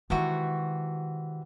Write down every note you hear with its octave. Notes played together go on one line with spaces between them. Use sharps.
C3 D#3 E3 G#3 F#4